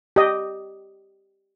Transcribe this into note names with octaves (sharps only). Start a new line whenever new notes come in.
G4 D#5